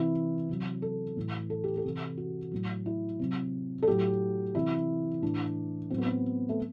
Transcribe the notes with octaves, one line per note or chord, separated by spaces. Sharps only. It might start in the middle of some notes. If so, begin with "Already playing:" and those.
Already playing: C3 E3 E4
C3 F#3
A4
A2 E3
A4
G4
A4
C3 E3
F#4
A2 F#3
E4
C3 F#3
A4
A2 F#3 G4
C3 E3 E4
A2 E3 D4
A2 F#3 C4
B3
C4
A3